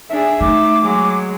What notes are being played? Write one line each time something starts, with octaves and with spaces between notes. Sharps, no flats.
D4 G#4 E5
A3 D#4 D6
F#3 G#3